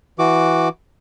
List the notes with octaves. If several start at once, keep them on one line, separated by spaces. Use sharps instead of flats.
E3 F#4 D6